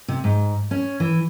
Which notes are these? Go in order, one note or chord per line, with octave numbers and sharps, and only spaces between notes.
C3
G#2
C#4
E3